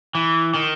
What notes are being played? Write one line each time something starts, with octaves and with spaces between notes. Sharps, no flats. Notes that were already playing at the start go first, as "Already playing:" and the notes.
E3
D#3